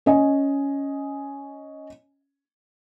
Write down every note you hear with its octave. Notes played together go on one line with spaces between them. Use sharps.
C#4 D#5 G#5